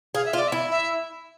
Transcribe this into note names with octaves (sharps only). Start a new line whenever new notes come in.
G#4 F5
E5
F4
D5
E5
E4
E5